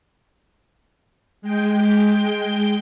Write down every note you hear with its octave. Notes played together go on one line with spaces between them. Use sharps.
G#3 G5 G6